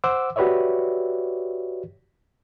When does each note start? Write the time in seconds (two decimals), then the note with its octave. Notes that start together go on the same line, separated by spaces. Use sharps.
0.04 C5 F#5 D6 E6
0.36 F#4 G4 B4 C#5 D5 E5